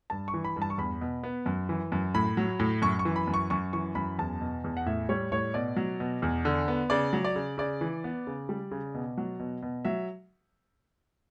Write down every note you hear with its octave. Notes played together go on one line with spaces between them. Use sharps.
G2 A5
C#6
E3
B5
G2
A5
C#6
E2 B5
B2
B3
F#2
E3
F#2
A2 B5
F#3
A2
F#2 C#6
C#6
E3
B5
F#2
C#6
F#2 C#6
E3 C#6
F#2 B5
E2 A5
B2
E2
F#5
A2 E5
G3 C#5
A2 C#5
B2 D5
F#3
B2
E2
D3
B3
C#3 D5
F#3
D5
C#3
C#3 D5
E3
B3
C#3
G3
C#3
B2
F#3
B2
B2
F#3 E5